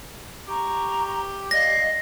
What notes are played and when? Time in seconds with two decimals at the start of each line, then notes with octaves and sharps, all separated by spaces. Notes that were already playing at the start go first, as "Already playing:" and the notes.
0.47 G4 A#5 C#6
1.51 D5 D#5 F5 A#6